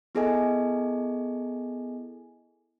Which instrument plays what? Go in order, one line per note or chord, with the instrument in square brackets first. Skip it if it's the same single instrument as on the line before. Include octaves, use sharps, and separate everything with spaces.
[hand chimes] B3 E4 G#4 A4 D#5 G#5